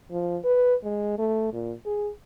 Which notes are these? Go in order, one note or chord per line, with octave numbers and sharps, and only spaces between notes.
F3
B4
G#3
A3
A#2
G#4